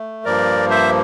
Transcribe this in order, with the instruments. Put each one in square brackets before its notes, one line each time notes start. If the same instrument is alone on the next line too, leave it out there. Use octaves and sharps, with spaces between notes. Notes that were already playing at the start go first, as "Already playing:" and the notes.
Already playing: [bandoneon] A3
G2 F3 A#3 A#4 D5
C5 E5